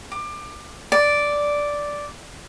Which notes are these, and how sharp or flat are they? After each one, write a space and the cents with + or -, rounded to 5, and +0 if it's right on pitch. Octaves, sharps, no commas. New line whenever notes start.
D6 +25
D5 -5